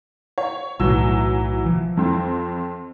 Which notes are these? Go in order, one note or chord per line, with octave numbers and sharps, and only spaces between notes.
C#5
B1 A2 E3 F#3 E6
E3 F3
F2 C4